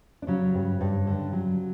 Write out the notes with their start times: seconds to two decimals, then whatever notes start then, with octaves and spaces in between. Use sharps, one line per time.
0.22 D4
0.27 C#3 F#3 C#4
0.54 G2
0.81 G2
1.07 D3
1.33 F#3